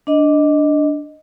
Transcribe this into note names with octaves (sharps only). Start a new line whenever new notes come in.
D4 D#5